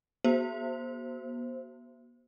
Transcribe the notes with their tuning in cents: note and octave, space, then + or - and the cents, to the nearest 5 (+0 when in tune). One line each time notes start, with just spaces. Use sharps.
B3 -35 F#4 +20 C5 +0